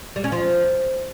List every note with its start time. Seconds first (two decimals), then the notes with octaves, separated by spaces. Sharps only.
0.16 G3
0.24 C#4
0.32 F3